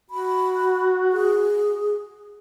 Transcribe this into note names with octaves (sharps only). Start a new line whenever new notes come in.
F#4 B5
G#4